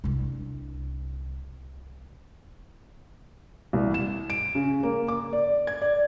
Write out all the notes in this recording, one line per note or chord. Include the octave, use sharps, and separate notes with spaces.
C2 D4
C2
E7
D7
C#3
A#3
D6
D5
G#6
D5